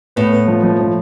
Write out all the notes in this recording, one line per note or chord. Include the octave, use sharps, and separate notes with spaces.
A2 B3
B3
F3
F3
F3